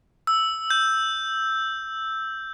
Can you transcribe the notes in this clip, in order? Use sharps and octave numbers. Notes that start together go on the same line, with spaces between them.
E6
G6